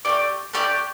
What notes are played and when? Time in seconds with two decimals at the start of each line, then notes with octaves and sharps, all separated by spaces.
0.05 A3 D4 G4 D5
0.53 A3 D4 G4 D5